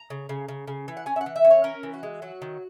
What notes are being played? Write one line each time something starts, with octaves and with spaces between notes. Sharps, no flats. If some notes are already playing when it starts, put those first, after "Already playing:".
Already playing: A#5
C#3
C#3
C#3
C#3
E3
F#5
C#4 G#5
E5
F#5
E3
E5
C#4
C#5
C#4 A#4
E3
F#4
G#3
F#3 F#4
D#3